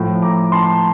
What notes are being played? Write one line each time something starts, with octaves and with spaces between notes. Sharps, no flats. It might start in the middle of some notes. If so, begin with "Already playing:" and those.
Already playing: A2 F3
A#5 D6
A5 C6